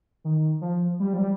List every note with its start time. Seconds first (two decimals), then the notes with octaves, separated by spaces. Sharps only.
0.24 D#3
0.61 F3
1.00 G3
1.13 F3
1.18 G3